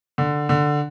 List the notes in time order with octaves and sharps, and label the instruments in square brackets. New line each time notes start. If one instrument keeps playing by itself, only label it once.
[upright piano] D3
D3